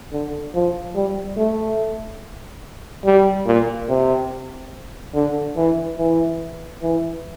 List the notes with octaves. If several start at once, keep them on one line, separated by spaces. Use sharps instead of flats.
D3
F3
G3
A3
G3
A#2
C3
D3
E3
E3
E3